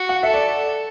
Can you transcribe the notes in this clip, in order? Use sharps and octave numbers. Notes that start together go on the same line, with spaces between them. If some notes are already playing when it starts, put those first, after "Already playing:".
Already playing: F#4
F#5
A4 E5
D5